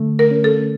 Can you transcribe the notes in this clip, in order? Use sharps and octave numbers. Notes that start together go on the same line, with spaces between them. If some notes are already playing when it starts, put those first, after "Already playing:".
Already playing: D3 A3
A#4
C#4
A4